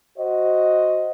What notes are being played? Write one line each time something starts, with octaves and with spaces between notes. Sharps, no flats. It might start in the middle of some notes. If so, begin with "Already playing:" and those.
F#4 C5 D#5